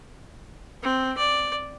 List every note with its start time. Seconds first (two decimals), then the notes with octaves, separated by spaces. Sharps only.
0.83 C4
1.17 D5